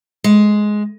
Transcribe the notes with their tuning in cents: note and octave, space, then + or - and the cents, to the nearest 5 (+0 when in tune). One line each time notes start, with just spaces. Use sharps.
G#3 +10